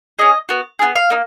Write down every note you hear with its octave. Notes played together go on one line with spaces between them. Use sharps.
C#4 G#4 D#5
B3 F#4
B3 F4 G#4
F5
A#3 D#4